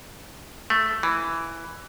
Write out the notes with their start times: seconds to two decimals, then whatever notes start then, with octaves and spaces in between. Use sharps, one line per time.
0.70 A3
1.03 E3